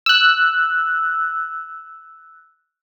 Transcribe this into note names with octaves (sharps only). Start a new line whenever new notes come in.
E6 F#6